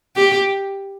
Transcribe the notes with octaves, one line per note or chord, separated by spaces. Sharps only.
G4